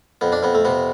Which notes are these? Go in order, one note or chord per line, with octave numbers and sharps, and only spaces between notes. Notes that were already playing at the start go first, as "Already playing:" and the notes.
F2 B3
D4
F2 B3
A3
C3 B3